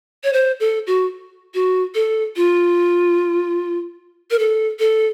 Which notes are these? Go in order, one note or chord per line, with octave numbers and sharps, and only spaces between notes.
C#5
C5
A4
F#4
F#4
A4
F4
A#4
A4
A4